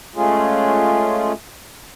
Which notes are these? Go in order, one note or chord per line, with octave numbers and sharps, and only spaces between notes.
G#3 A3 C#4 F4 G#4